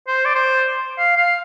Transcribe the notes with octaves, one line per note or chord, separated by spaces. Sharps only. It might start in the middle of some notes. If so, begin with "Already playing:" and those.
C5
D5
C5
F5
F5